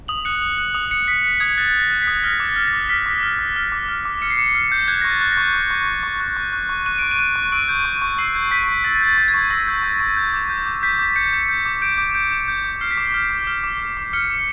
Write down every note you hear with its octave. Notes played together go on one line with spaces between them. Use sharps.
D#6 F#7
F#6 C#7
D#6
F#6
D#6
F#6 C#7
D#6 B6
F#6 C#7
D#6 G#6
F#6 A6
D#6
A#6
F#6
B6
D#6
F6 A#6
D6
A6
F6
A#6
D6
F6 B6
D6
F6
D6
F6
D6
F6
D6
F6 C#7
C7
D6 C#7
F6
D6 G6
F#6 G#6
C#6 A#6
A6
F#6
A#6
C#6
F#6
C#6
F#6
C#6
F#6
C#6
F#6
C#6
F#6 D#7
C#6 D7
D#7
F#6
C#6
E6 D7
G6
C#6
C#6
E6 C7
G6
C#6 B6
C#6
E6 A6
G6
A6
C#6
G#6
C#6
E6 A#6
G6
C#6
C#6
G6
D6
G6
D6
G6 B6
D6
G6 C#7
D6
G6
D6
G6 D7
D6
G6 D7
D6
G6
D6
F6 C7
B6
D6 C7
F6
D6
F6
D6
F6
D6
F6 C#7
D6